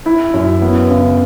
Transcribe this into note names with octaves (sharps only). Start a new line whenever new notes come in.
E4
F#2
B3
C#3